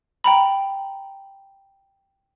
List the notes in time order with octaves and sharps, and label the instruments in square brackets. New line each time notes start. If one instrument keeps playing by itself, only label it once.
[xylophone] G5 A#5 B5